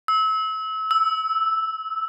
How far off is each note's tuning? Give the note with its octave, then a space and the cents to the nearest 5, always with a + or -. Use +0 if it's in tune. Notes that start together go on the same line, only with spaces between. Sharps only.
E6 -30
E6 -5